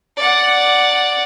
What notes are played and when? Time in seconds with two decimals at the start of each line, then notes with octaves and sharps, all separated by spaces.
0.17 D5 F#5